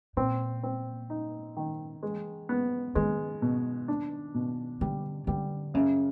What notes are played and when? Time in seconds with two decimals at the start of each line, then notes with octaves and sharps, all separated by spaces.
0.17 A#2 C4
0.63 C4
1.10 D#4
1.57 D#3
2.03 E3 G#3
2.49 B3
2.95 D#3 G#3
3.42 B2
3.88 D4
4.34 B2
4.81 D3 G3
5.27 D3 G3
5.74 F#2 C#3